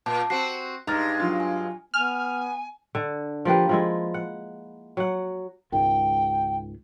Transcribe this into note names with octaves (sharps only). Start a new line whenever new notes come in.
A#2 A5 D6
C4 F#4 C7
G2 G#3 D#4 A#5 D6 F6 A6
F#3 D4 F4
G#5
B3 G#5 F6
D3
F3 A#3 G4 B4
F3 G#3 E4
F#5
F#3 F#5
C#2 G#2 D#3 G5